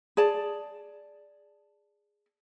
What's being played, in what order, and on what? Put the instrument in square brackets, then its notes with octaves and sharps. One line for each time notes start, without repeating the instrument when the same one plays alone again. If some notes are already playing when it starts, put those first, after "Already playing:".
[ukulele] G#4 D5 A5